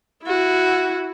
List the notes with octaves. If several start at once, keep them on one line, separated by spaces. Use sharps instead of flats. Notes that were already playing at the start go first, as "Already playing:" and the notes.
E4 F#4